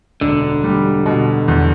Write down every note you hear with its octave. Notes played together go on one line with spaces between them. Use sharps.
E1 D3
G3
B2
E2